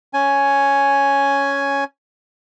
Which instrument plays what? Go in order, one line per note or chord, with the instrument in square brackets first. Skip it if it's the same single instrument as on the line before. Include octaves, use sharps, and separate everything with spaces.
[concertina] C#4 G#5